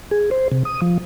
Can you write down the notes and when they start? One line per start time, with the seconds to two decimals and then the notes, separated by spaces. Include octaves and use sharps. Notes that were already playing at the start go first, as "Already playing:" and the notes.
0.11 G#4
0.31 C5
0.52 C3
0.65 D#6
0.82 F3